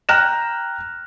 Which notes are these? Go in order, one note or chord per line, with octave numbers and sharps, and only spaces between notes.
G5 A#5 F6 F#6 A#6 E7